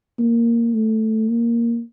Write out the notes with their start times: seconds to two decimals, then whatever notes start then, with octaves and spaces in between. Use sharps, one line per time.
0.19 A#3
0.74 A3
1.30 A#3